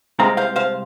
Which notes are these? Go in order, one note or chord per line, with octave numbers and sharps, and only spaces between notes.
C2 C3 G#3 C4 F5 A#5
C5 F5
C5 F5